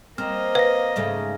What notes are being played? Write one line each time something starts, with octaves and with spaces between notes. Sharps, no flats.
A#3 C4 D#5 F6
B4 F5 A#6
G#2 C#3 A3